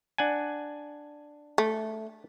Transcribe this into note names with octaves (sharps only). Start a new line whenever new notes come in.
D4 F#5 G#5
A3